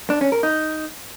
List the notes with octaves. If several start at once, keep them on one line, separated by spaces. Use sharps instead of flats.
D4
C#4
A#4
D#4